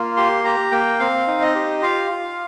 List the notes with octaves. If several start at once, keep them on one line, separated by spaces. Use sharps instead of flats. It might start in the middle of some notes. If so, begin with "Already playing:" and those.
Already playing: A#3 F4
G4 C6
G4 A#5
A#3 G5
C4 F5
D#4
D#5
G4
F4 F5
F4